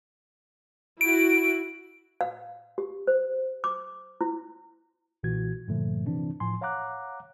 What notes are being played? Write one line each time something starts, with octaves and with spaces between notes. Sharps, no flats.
E4 F#4 D7
F5
G4
C5
D6
E4
B1 A#2 E3 F#4 G#6
G2 A#2 D3 F3 A3
C3 E3 C4 D4
A2 F3 G#5 C6
C#5 F5 F#5 A#5 D6 F#6